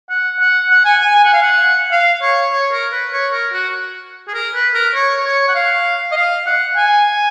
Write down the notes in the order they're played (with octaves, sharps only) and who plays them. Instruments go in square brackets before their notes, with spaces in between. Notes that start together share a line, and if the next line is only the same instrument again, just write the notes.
[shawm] F#5
F#5
F#5
G#5
G#5
G#5
F#5
F5
F#5
F5
C#5
C#5
A#4
B4
C#5
A#4
F#4
G#4
A#4
B4
A#4
C#5
C#5
F#5
F5
D#5
F5
F#5
G#5